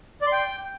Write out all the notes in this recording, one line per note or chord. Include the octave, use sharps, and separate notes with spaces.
D5
C6
G5